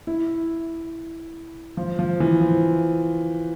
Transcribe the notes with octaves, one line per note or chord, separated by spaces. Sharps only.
E4
F3
F3
E3
F3